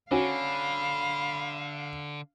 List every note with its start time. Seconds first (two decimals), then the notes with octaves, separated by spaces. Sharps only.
0.11 D3 C#4 F#4 F5 G#5 B5